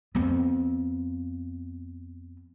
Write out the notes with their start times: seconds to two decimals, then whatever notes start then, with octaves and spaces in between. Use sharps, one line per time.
0.15 F2 B3